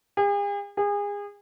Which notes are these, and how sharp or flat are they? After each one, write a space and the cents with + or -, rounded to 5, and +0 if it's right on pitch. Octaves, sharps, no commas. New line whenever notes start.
G#4 -45
G#4 -30